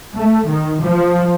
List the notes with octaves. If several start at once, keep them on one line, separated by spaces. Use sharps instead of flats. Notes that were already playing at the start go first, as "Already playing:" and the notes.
A3
D#3
F3